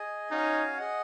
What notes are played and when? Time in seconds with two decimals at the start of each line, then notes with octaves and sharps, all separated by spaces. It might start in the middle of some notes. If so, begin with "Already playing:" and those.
Already playing: G#4 D#5 G#5
0.31 C#4 D#4 F#4 C#5 F5 G#5
0.78 G#4 D#5 F#5